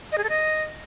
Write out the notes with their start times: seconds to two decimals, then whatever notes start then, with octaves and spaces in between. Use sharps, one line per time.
0.12 D#5
0.18 G#4
0.24 A4
0.30 D#5